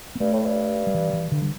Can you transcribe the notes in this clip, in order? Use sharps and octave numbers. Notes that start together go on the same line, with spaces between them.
B3
G2 A3
A2
G2
G3
E3
E3
D3
G3